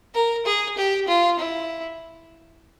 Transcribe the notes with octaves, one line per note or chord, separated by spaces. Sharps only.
A#4
G#4
G4
F4
E4